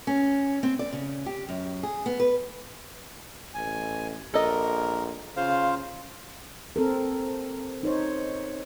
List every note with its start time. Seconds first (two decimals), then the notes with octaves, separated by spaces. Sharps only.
0.07 C#4
0.63 C4
0.79 D5
0.92 C#3
1.26 G4
1.49 F#2
1.83 G#4
2.06 B3
2.20 B4
3.54 A1 G#5
4.34 A#1 A4 A#4 D#5
5.37 C#3 F4 C5 F5
6.76 C4 A4 A#4
7.83 D#4 C5 C#5